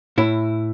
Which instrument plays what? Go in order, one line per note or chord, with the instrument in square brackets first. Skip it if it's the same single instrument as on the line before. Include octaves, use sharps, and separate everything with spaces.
[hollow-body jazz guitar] A2 E4